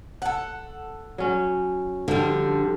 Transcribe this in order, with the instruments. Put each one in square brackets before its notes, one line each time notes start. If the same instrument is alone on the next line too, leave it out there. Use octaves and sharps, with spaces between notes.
[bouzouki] A4 F#5
[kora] F#3 C#4
[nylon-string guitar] D3 [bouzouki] F3 G3